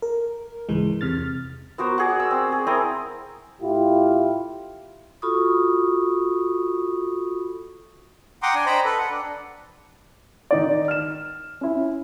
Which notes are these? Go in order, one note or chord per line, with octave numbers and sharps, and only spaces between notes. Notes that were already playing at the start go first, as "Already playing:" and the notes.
A#4
C#2 G#2 E3 G#3
E2 C3 F6 A6
B3 F#4 A#4 C5
F#4 G#4 D5
E6
C4
G#4
C4 E4 A#4 D#6
A2 E4 F4 G4
F4 F#4 A4 B5 C#6 D#6
F#5 G5 A#5 C6 D6 D#6
D4 G#5
C5 D#5 G5 A#5 B5
A4 B4
F#5
D4
D#3 D#4 D5
F6 E7
C#4 E4